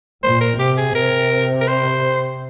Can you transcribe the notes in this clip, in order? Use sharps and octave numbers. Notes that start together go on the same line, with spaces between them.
A#2 C5
A#4
C3 G4
G#4
C3 A#4
A#4
C5